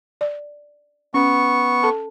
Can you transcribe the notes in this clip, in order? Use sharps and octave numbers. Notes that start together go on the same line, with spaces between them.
D5
B3 C#4 C#6
A4 A5